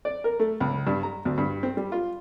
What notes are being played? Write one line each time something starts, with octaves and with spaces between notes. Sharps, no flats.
D5
A#4
A3
C#2
G2
A#5
D2
G2
C4
G3
F4